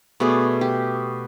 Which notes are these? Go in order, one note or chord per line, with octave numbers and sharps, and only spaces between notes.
B2 A3 G#4 D5
G4